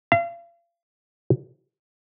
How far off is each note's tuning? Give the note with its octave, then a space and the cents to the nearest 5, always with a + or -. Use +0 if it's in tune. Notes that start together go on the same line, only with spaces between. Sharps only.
F5 -35